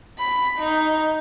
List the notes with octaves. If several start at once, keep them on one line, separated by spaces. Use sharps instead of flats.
B5
D#4